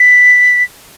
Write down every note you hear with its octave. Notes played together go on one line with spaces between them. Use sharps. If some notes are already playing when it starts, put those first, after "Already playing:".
Already playing: B6